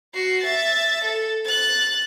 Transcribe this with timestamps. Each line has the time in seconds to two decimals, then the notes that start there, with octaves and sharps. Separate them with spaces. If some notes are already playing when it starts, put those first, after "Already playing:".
0.14 F#4 C7
0.44 E5 A6
1.04 A4
1.45 F#6 A6